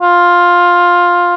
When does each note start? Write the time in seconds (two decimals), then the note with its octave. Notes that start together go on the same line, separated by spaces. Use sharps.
0.02 F4